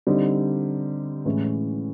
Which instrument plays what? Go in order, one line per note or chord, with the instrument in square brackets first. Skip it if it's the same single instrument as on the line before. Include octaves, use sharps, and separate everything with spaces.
[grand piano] D3 G3 C4 D#4
A2 E3 G#3 C#4